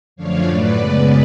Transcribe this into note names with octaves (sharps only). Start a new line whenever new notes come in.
F#2 D3 F3 A3 D4 C#5 F5
A2 F#3 A3 B4 D5
F#2 C#3 G#3 B3